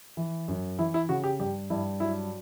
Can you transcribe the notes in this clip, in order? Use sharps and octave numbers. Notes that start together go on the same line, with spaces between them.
E3
F#2
E3 E4
E4
C#3 F#4
G4
G2 G4
G2 E4
F#3 E4